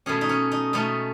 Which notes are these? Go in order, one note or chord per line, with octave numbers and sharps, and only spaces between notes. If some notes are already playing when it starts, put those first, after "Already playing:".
B2 A3 C#4 G#4
D#4
C#4
D#4
B2 A3 C#4 D#4